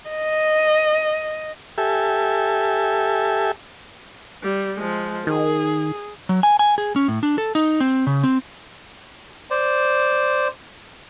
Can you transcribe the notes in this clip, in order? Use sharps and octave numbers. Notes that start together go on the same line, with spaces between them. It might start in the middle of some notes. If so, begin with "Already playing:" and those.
D#5
G4 A4 E5 G#5
G3
F3 G#3
D#3 G#4
F#3
G#5
G#5
G#4
C#4
A2
D4
A4
D#4
C4
C#3
C4
C5 D5